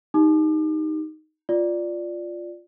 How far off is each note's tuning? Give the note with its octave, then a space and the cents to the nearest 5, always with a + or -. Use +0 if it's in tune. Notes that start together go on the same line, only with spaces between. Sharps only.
D#4 +0 G4 +0 D6 +35
F4 +0 D5 +0